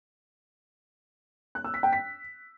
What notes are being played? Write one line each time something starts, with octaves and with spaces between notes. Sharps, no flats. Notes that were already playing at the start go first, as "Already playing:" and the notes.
F#6
E6
B6
G5
B6